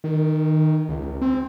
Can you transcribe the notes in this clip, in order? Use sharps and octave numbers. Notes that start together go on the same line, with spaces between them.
D#3
C#2
C4